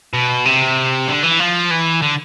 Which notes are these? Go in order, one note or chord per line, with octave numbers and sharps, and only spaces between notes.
B2
C3
D3
E3
F3
E3
D3